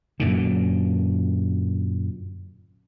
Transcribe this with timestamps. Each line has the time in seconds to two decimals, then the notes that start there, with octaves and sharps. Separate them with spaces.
0.20 F#2 A#2 D3